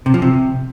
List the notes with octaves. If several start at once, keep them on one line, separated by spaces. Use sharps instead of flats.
C3
F3
C3